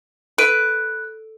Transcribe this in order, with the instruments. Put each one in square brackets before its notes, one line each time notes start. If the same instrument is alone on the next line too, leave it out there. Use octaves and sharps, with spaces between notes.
[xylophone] A4 D7 D#7 [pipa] B4